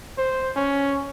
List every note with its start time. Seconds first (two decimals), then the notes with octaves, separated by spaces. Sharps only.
0.18 C5
0.56 C#4